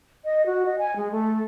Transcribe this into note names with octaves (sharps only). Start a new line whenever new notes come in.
D#5
F#4
D#5
G#5
G#3
A3